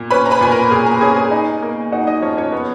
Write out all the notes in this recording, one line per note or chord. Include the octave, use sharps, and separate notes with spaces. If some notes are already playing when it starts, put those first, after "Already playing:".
Already playing: A#2
C#4 B4 B5
A#5
B4 B5
A#2 G#5
A#4 A#5
A#2 G#4 G#5
A#4 A#5
C#4 G#4 G#5
G#4 G#5
D#4
A#3
D#4 F#4 F#5
D#4 D#5
F3 C#4 C#5
C#4 C#5
B3